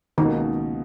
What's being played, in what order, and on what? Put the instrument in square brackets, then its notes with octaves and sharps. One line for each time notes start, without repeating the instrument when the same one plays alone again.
[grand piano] C#2 B2 A#3 D#4 [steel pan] D#3